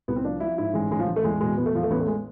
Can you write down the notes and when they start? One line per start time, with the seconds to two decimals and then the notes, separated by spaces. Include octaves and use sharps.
0.08 C2 B3
0.16 C4
0.25 F3 D4
0.40 F3 E4
0.58 G#2 E4
0.74 A1 G#3
0.91 A1 G#3
0.99 F3
1.08 A1
1.16 A3
1.24 E2 G#3
1.41 B2 G#3
1.57 E2 B3
1.66 A3
1.75 E2 F3
1.83 A3
1.91 A1 B3
2.00 A3
2.08 G#3